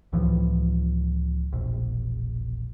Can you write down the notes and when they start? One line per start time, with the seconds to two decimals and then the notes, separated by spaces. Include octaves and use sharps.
0.13 C#2 A2 E3 F3
1.53 E1 A#1